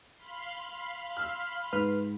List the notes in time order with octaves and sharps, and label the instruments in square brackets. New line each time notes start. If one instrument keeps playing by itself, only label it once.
[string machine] F5 B5 C6
[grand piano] E6 F6
[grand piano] G#2 [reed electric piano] B4 F6